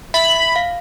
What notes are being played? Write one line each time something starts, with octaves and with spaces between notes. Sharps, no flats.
E5 B5
F5